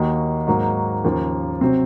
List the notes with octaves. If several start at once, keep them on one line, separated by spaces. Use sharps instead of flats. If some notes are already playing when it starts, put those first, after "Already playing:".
Already playing: D#2 D#3 A#3 D#4 F#4
G#2 F#3 A#3 D#4 F#4
D#2 C#3 F3 A#3
C3 F#3 C4